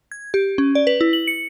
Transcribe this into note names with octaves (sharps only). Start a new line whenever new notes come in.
G#6
G4
C#4
D5
B4
E4
F#7
C#7